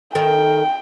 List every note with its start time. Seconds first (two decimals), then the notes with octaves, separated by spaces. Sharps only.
0.15 D#3 A4 A#4 G5